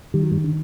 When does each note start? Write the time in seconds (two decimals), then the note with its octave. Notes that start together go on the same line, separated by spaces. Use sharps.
0.14 D#3 G3
0.23 F#3
0.31 G2 G3
0.44 D3